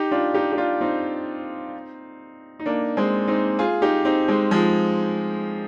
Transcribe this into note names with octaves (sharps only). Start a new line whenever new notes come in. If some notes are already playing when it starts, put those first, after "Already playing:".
Already playing: D#4 G4
D4 F4
D#4 G4
G4
D4 F4
C4 D#4
D#4
A#3 D4
G#3 C4
C4 D#4
F4 G#4
D#4 G4
C4 D#4
G#3 C4
F3 G#3